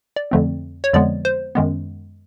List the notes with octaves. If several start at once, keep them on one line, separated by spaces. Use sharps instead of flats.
D5
F2 D3 F3 A3 C4
C#5
F2 D3 F3 G#3 B3 D5
C5
F#2 D#3 G#3 B3